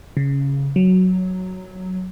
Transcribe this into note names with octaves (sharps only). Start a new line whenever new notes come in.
C#3
F#3